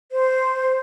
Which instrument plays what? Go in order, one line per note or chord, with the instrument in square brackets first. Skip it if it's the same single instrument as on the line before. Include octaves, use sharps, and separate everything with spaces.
[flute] C5